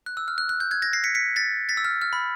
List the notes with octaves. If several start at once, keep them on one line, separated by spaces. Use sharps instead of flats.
F#6
E6
F6
F#6
F#6
G6
F#6 G#6
G#6 A#6
A#6 C7
B6 C#7
B6 C#7
A6 B6
A6 B6
E6
F6
F6
B5